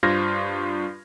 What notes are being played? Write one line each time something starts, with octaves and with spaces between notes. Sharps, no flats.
G2 F4 C5 F6 G#6 A#6